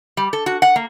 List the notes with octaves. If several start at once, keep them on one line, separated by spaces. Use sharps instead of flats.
G3
A4
F#4
F#5
A#3